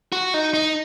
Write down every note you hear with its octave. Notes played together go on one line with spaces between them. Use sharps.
F#4
D#4
D#4